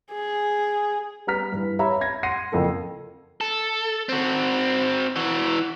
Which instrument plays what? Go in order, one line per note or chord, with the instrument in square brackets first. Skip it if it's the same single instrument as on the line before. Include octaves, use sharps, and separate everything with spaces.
[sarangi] G#4
[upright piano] G3 B3 A#5 F6 B6
G2 E3
G4 C#5 E5 A#5 B5
B5 G#6 A#6
F#5 C6 A#6 C7 D#7
F#1 F2 F3 A4 A#4
[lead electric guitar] A4
C4 F#4
E3 F#4